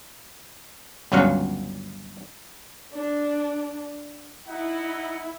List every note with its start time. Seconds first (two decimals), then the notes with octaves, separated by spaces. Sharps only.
1.12 G1 C#2 F#3 C#4 F5 F#5
2.93 D4
4.48 D#4 E4 F#5